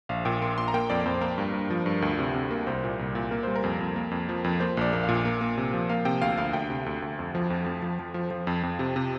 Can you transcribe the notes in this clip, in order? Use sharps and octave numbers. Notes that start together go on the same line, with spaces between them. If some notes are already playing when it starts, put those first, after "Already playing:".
A#1 F5
A#2 G5
A#3 C6
A#2 C6
A#5
A#3 G5
F2 D5
F2 C5
A#3 A#4
G2
G2
F3
G2
D2
C3
C3
A#3
C2 C5
A#2
C2
A#2
A#3 A#4
G3 C5
A#4
F2
F2
A#3
F2
F3
F2
A#3 C5
A#1 D5
A#3
F5
A#2
A#3
A#3
C3
F3
A#3 F5
C3 G5
D2 F5
D2 F5
D2 G5
C3
D2
D2
F2
F3
F2
F2
F3
F3
F3
F3
F2
F2
C3
C3